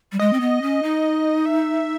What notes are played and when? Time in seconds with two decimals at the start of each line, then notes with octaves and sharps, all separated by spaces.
0.12 G3
0.19 G#3 D#5
0.33 C4
0.40 B3
0.62 C#4
0.83 D#4
1.46 E5